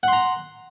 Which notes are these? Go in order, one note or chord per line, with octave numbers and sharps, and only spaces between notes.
F#5 A#5 C6